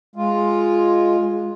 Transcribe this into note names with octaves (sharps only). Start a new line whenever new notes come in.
G#3 F4